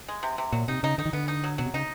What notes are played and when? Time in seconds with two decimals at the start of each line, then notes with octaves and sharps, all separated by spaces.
0.08 G#3
0.23 C3
0.38 C3
0.52 A#2 F#3
0.68 C3 D#4
0.83 C#3 D#4
0.98 D3 D#4
1.05 D#3
1.13 D3 B3
1.28 D#4
1.44 F#3
1.58 B2 F#3
1.66 C3
1.74 C#3 D#4